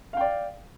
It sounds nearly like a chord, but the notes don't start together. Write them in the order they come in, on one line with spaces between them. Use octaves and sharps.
F5 G5 D5